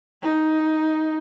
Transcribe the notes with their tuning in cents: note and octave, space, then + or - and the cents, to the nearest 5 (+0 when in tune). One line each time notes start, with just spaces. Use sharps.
D#4 +10